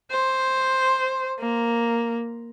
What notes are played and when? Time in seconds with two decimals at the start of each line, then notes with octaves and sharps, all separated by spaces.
0.11 C5
1.40 A#3